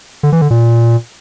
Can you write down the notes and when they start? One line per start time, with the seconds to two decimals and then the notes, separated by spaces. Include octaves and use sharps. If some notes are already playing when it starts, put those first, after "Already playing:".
0.23 D3
0.32 E3
0.41 D3
0.50 A#2